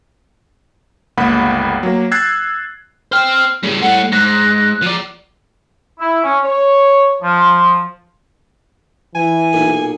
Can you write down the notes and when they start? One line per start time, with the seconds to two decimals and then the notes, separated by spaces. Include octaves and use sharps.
1.17 G1 C#2 A#3 F#5 B5
1.83 F#3 A#3
2.12 E6 F#6 G#6 A6 C7
3.12 C5 G5 F6
3.63 A2 C#3 G3
3.82 A2 A3 F#5
4.12 G#2 F#6 A#6
4.83 F3 D5
6.00 E4
6.24 C#4
6.45 C#5
7.23 F3
9.15 E3 G#5
9.53 B1 A#2